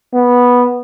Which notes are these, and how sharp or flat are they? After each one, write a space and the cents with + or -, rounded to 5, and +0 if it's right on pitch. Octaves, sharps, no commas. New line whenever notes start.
B3 -10